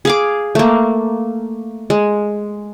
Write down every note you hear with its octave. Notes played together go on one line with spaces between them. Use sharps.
G#4 F5 D6
A3 A#3
G#3